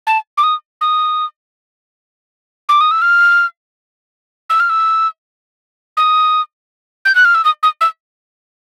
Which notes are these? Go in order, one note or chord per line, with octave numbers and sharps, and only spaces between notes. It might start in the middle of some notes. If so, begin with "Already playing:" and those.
A5
D6
D#6
D#6
D6
D#6
E6
F6
E6
F6
E6
D#6
G6
F#6
F6
E6
D#6
D#6
E6